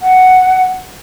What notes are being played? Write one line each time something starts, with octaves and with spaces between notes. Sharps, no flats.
F#5